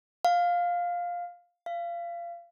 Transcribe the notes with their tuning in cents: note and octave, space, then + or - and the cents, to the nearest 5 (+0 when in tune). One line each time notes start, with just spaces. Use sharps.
F5 +10
F5 -25